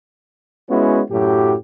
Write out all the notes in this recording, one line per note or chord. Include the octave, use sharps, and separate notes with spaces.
G#3 B3 C#4 E4 F#4
F#2 A2 F#3 G4